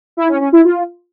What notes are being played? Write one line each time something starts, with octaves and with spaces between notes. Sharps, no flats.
E4
C#4
C#4
E4
F4